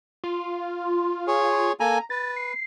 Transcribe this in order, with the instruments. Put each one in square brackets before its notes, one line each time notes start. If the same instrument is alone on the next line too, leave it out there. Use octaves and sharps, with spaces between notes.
[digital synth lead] F4
[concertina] G#4 C#5
[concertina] A#3 A4 G#5 [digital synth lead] A#5
[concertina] B4 [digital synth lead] A6
[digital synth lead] C7